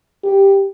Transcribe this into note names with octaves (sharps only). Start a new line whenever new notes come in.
G4